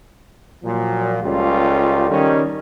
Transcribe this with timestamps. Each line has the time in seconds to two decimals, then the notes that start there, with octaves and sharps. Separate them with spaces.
0.64 A#2 F3 F#3
1.23 C#2 G3 C#4 F4 G4 A4
2.09 D#3 G3 C#4